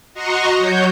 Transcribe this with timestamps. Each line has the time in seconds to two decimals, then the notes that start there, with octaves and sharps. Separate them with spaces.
0.14 F#4 D#5 F#5 A#5 C6 C#6
0.57 F#3 F#4 C#5 G6